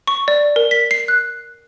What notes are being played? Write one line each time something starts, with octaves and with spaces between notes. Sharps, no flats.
C#6
D5
A#4
B6
C7
F#6